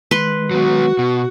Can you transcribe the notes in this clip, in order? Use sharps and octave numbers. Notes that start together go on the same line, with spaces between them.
D#3 G#3 B4 C6
F#3 B3 F#4
B2